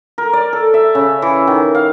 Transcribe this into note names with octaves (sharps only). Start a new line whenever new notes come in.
A#4
D5
A4
E5
C#3
E3
D#3
F5